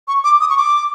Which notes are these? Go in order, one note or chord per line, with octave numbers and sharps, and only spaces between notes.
C#6
D6
D#6
C#6
D6